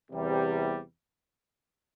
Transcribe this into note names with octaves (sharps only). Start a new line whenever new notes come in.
E2 C3 G3